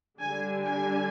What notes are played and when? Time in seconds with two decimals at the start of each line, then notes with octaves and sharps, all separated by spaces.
0.20 D3 G3 D4 G#5
0.63 G#5